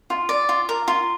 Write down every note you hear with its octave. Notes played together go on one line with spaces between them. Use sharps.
F4
D5
F4
A#4
F4